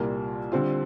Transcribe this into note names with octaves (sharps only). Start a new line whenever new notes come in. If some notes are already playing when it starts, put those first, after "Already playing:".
Already playing: C2 A#2 G3 A#3
D3 G3 C4 F4